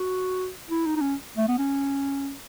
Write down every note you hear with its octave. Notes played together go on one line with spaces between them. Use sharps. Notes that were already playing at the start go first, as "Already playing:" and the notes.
Already playing: F#4
E4
D#4
D#4
C#4
A3
B3
C#4